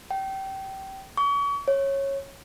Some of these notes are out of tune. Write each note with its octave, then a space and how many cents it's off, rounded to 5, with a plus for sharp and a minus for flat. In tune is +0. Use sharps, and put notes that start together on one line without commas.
G5 -25
C#6 +40
C#5 -15